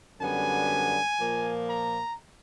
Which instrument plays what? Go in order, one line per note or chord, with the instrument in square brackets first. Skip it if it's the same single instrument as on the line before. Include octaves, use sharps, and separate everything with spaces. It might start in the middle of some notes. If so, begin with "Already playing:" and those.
[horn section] F#2 D3 G3 B3 G#5
A#2 F3 A#3
A#5